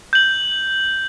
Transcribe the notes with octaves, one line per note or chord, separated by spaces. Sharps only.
G6 F#7